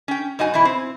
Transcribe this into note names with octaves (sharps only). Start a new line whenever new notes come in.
C#4 G5
F#2 D#4 F#4 G#5
B2 E3 E4
C4